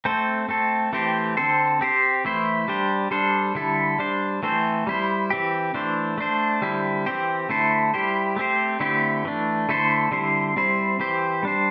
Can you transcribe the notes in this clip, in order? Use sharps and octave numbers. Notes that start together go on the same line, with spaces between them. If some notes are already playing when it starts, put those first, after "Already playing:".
A3 C4 A4 C5
A3 C4 A4
E3 A3 C4 G4 C5
D3 C4 A4 C5
C4 G4 C5
E3 A3 E4 C5
G3 D4 G4 C5
G3 D4 A4 C5
D3 G3 E4 A4
G3 D4 C5
E3 A3 C4 A4 C5
G3 E4 C5
E3 C4 G4
E3 A3 D4 C5
A3 D4 C5
D3 G3 C4 E4
E3 C4 G4 C5
D3 A3 E4 A4 C5
G3 E4 G4 C5
A3 C4 G4 C5
D3 A3 C4 E4 G4
E3 A3 D4
D3 A3 E4 A4 C5
D3 G3 C4 E4 C5
G3 C4 E4 C5
E3 C4 G4 C5
G3 D4 C5